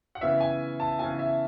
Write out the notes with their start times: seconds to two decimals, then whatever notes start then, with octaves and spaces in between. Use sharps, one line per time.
0.15 F#5
0.21 C#3 E3 B3 E5
0.41 G#5
0.80 A5
0.99 C#3 E3 B3 G#5
1.19 E5